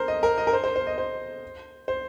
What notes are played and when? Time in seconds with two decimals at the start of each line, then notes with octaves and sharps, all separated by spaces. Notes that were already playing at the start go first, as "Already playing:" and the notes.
Already playing: A#4 C5
0.08 D#5
0.23 A#4
0.38 D#5
0.47 A#4
0.53 C5
0.64 C5
0.76 C5
0.87 D#5
0.98 C5
1.88 C5